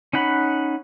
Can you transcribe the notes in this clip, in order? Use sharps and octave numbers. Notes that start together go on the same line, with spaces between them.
C#4 D#4 F#5 B5